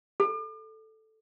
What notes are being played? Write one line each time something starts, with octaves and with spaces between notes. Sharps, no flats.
A4